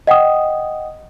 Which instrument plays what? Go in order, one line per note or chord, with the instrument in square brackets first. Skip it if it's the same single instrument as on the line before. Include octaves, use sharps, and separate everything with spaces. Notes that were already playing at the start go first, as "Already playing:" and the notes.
[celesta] D#5 F#5 G5 D#6